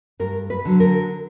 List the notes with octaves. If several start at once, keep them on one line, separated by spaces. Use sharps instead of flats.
G2 A#4
B4
D3 F#3
A#4